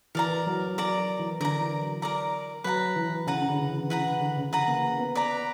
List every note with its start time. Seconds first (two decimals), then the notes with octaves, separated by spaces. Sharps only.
0.15 E3 A#4 D5 A#5
0.47 F#3
0.78 F#3 A#4 D5 A#5
0.98 F#3
1.19 E3
1.40 D3 A#4 D5 A#5
1.61 E3
1.81 F#3
2.02 A#4 D5 A#5
2.64 F#3 B4 F#5 A#5
2.96 E3
3.27 C#3 B4 F#5 A#5
3.41 C#3
3.48 D3
3.69 E3
3.90 E3 B4 F#5 A#5
4.06 C#3
4.20 D3
4.36 C#3
4.52 E3 B4 F#5 A#5
4.68 A#3
4.99 B3
5.15 B4 D5 A#5